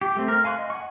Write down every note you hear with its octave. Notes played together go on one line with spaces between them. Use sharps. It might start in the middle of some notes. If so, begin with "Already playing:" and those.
G4
A3 C4
A#4 F6
F5 G#5 C6 C#6 F#6
D#5
F#5 G#5 C#6